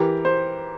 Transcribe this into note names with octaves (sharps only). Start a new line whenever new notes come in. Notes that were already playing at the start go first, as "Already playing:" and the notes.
Already playing: E3 G4 A#4
C5